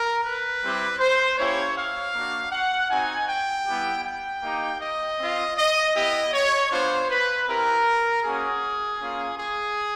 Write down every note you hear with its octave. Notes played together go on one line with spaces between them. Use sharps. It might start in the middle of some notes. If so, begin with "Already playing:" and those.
Already playing: A#4
B4
G3 C4 E4 G4
C5
A#3 C#4 E4 G4 C#5
F5
A#3 D4 F#4
F#5
C4 D#4 F#4 G#5
G5
G3 B3 E4 G4
G5
A#3 D#4 G4
D#5
C4 F4
D#5
B3 E4 G4 D#5
C#5
B3 D4 F4 C5
B4
C4 E4 G4 A#4
A#3 C#4 F#4 G#4
A#3 C#4 F4
G#4